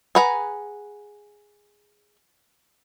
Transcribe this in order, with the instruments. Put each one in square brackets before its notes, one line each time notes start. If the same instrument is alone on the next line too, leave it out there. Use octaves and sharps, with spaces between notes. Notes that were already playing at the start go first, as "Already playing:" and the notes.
[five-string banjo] G#4 B4 F#5 G#5 A#5